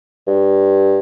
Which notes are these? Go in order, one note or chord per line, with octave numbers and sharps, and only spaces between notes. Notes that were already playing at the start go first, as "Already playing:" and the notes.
G2